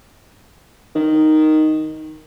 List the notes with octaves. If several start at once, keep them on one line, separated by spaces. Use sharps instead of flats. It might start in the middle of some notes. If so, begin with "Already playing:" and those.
D#3